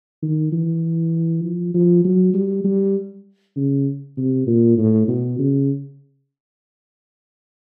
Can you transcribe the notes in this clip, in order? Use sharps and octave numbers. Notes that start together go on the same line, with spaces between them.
D#3
E3
F3
F3
F#3
G3
G3
C#3
C3
A#2
A2
B2
C#3